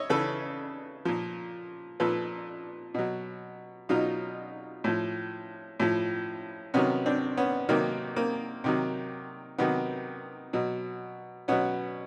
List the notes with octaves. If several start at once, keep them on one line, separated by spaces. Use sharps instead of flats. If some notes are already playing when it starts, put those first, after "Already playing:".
Already playing: C#5 D#5 E5
C#3 E3 A4 B4
A#2 F3
A#2 F3 A4 B4
B2 F#3
B2 F#3 D#4 F4
A2 F3
A2 F3
C3 D#3 F#3 B3 C#4
C4 D4
B3 C#4
C3 D#3 F#3 A#3 C4
A#3 C4
C3 D#3 F#3
C3 D#3 F#3 B3
B2 F#3
B2 F#3 B3 C#4